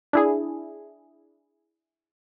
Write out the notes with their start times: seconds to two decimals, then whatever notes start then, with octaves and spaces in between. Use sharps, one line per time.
0.13 D4 E4 G#4